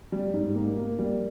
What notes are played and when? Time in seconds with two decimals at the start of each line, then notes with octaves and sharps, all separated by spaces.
0.12 G3
0.33 G#2
0.55 A#3
0.77 A#3
0.99 G3